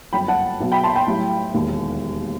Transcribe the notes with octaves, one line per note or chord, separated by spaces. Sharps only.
G1 F#2 F#3 G5 B5
F#5 A5
B1 B2 F#3
G5 B5
A5 C6
G5 B5
B1 A2 G3
E1 D#2 D#3